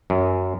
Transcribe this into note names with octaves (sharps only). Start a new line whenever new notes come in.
F#2